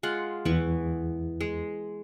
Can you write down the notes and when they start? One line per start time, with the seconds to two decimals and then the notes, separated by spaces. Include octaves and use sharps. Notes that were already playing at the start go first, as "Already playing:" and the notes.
0.03 G#3 F4 F#5
0.45 E2 E3 B3 C#6
1.41 G#3